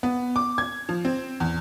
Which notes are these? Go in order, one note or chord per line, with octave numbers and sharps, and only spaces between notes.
B3
D6
G#6
F3
C4
E2